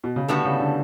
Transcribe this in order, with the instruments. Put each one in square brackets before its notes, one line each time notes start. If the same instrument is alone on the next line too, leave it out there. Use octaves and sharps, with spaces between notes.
[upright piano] B2
C#3
[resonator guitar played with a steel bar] A2 G3 B3 F#4 A4 [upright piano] D3
[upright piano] C#3
D3